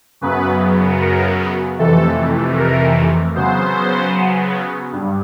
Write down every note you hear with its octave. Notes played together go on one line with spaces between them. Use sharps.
F#2 C#3 F#3 B3 B4
A#4
F2 C3 E3 A3 A4
A#4
C#3 F#3 B3 C5
G2